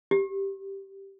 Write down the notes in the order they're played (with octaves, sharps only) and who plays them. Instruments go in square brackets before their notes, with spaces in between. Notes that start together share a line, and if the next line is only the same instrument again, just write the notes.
[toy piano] G4